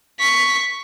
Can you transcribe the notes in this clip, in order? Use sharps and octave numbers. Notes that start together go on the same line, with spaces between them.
C#6 B6